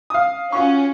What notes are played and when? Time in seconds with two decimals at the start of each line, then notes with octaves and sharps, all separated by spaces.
0.10 F5 D#6
0.52 C#4 F4 F#4 C#6